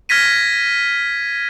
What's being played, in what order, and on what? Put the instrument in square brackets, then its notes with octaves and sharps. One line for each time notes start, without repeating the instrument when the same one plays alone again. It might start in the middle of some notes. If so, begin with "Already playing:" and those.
[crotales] F6 G#6 A#6 B6 D#7